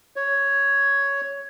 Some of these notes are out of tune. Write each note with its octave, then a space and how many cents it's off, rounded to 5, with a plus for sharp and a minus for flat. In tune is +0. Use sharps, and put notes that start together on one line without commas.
C#5 +5